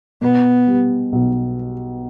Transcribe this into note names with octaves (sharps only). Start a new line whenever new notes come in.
B2 B3
G3
B1